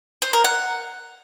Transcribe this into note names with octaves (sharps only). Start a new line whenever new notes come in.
C5
A#4
F#5